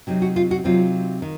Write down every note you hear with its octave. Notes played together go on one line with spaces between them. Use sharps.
C3 F#3 C4 D#4
F#4
F4
F#4
C3 F#3 C4 D#4 F4
D#3